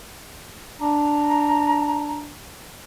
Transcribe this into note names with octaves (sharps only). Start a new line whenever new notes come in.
D4 A#5